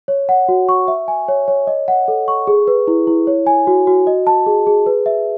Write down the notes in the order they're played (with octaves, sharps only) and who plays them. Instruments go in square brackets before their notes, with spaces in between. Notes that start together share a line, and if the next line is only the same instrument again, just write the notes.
[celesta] C#5
F#5
F#4
C#6
E5
G#5
C#5
C#5
D#5
F#5
A4
C#6
G#4
B4
E4
E4
C#5
G#5
F#4
F#4
D#5
A5
G#4
G#4
B4
E5